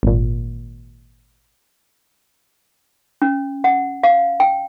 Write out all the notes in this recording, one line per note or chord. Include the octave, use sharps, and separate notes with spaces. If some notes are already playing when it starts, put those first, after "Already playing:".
G#1 A#2
C#4
F#5
F5
G5